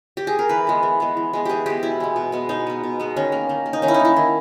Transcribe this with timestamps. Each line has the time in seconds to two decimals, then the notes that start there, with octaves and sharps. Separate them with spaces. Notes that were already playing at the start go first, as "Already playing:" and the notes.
0.17 G4
0.27 G#4
0.39 A#4
0.49 E3 B4
0.67 G#3 B3
0.83 E3
1.00 G#3 B3
1.17 E3
1.33 G#3 B3
1.45 E3 G4 G#4
1.66 G#3 B3 G4
1.83 B2 E4
2.00 G#3 B3
2.16 B2
2.32 G#3 B3
2.49 B2 D#4
2.67 G#3 B3
2.83 B2
3.00 G#3 B3
3.16 D#3 C#4
3.32 A#3
3.49 D#3
3.66 A#3
3.73 D#4
3.82 D#3 C#4
3.88 E4
3.94 D#4
4.00 A#3
4.05 E4
4.16 D#3